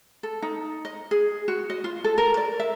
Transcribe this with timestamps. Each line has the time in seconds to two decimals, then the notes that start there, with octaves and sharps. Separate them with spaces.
0.23 A4
0.42 D#4
0.85 D#5
1.11 G#4
1.48 F#4
1.70 D#5
1.84 F4
2.04 A4
2.18 A#4
2.37 D5
2.60 E5